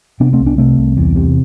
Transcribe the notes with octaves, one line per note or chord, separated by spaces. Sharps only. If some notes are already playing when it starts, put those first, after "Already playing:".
C3 B3 D4
A3 C4
C2
B3 D4
C3 A3 C4
C2
E2
C3